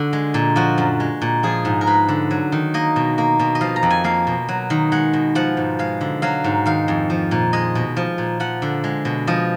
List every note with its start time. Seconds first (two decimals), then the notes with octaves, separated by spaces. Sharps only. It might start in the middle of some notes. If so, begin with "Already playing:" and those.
Already playing: D3 F#4
0.13 G#3
0.34 A#2
0.56 F3 F#4
0.78 F#2
1.00 G#3
1.22 A#2
1.43 F3 G#4
1.65 G#2
1.81 A#4
1.87 G#3 B4
2.09 D3
2.31 F#3
2.52 D#3
2.74 A#3 D#5
2.96 B2
3.18 A#3
3.39 B2
3.55 D#5
3.61 F3 F5
3.76 A#5
3.83 F2
3.90 G#5
4.04 A#3 F5
4.27 B2
4.49 F#3
4.70 D#3
4.92 G#3 F#5
5.13 B2
5.35 F3 F#5
5.57 G#2
5.79 G#3 F5
6.01 D3
6.22 F#3 F5
6.44 G#2
6.66 D#3 F5
6.88 F2
7.10 F3
7.31 A#2
7.53 G#3 D#5
7.75 B2
7.97 F3
8.18 A#2
8.40 F3 F#5
8.62 D3
8.84 G#3
9.05 B2
9.27 F3 D#5